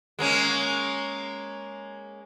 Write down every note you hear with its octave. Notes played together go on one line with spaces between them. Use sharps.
G#3 A#3 C#4